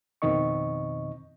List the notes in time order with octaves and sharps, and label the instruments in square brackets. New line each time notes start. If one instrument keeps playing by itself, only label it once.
[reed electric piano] F2 B2 D#3 C4 D#5 C#6